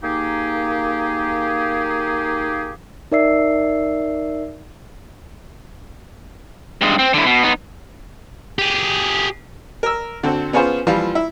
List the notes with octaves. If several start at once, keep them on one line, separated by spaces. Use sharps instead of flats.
A#3 D#4 G4 G#4
D#4 A#4 D5 E5 E6 C7
G2 G#3
C4
D3 E4
B2
B3 D#4
G4 G#4
A#4 E6
D3 C4 F#4
B3 C#4 F4 G#4 C5
E3 F3 G3 F4
E4